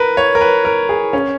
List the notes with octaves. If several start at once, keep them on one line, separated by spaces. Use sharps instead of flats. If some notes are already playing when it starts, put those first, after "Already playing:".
Already playing: A#4 B4
C#5
A#4
B4
A#4
G#4
C#4